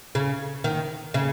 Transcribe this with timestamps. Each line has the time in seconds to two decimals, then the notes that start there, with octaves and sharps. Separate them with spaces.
0.15 C#3
0.64 D#3
1.14 C#3